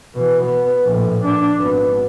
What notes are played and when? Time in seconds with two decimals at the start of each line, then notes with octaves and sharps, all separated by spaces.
0.15 B2 E3
0.46 B3
0.85 A#1 A2
1.24 D4
1.57 G#1 B3